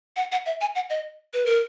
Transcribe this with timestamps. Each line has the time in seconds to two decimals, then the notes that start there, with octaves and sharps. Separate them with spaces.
0.16 F#5
0.32 F#5
0.46 E5
0.61 G#5
0.75 F#5
0.90 D#5
1.33 B4
1.46 A#4